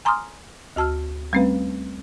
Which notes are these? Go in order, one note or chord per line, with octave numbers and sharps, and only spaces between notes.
G#5 A#5 C6 D6 D#6 F6
D2 F#4 A5 E6 F6
G3 A3 C4 C#4 B4 F5